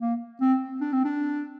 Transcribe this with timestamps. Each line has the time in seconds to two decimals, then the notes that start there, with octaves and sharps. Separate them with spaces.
0.01 A#3
0.41 C4
0.81 D4
0.93 C4
1.05 D4